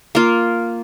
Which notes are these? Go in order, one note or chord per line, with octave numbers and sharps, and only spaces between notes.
A#3 F4